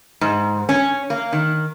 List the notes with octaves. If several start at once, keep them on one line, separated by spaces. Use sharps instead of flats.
G#2
C#4
A#3
D#3